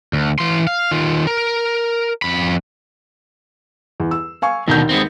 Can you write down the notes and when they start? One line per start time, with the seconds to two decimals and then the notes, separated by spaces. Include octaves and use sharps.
0.13 D2
0.39 E3 C6
0.67 F5
0.91 D#3 F4
1.27 A#4
2.22 F2 B5
4.00 E2
4.11 E6
4.42 F5 G#5 C#6
4.68 D#2 B2 D3 D#3 G6
4.89 G#3 B3 C4